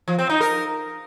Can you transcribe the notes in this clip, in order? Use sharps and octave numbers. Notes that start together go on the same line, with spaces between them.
F3
C4
D#4
A#4